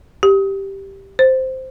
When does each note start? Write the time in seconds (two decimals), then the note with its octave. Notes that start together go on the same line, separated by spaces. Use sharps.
0.23 G4
1.19 C5